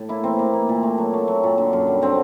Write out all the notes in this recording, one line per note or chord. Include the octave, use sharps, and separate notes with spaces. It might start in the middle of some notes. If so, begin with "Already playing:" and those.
Already playing: A2
A#3 E4
E3 C4
A#3
A#3
A#2
A3
F#3
A3
F#3
A#2
D3
F#2
G3
D3 C4